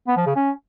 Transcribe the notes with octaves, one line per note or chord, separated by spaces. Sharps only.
B3
F3
C#3
C#4